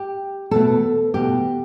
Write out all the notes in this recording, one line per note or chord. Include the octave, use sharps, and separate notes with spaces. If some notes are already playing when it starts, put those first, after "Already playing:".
Already playing: G4
E2 B2 A3 A4
E2 B2 A3 G4